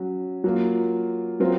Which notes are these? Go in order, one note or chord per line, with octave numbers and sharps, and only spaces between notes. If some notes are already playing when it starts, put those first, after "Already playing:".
Already playing: F#3 C#4 F#4
F#3 A#3 F4
F#3 C4 F4 A#4